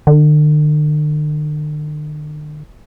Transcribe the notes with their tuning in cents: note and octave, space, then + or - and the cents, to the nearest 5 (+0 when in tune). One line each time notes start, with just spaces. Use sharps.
D3 +45